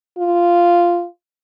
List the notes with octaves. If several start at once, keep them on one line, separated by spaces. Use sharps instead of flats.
F4